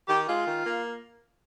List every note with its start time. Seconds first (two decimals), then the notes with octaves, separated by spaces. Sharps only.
0.08 D#3 G4
0.28 G#3 F4
0.46 D#3
0.64 A#3